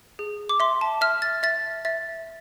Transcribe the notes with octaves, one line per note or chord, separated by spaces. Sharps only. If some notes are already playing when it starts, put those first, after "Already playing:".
G#4
D6
E5 C6
A5
E5 F6
A6
E5 A6
E5 A6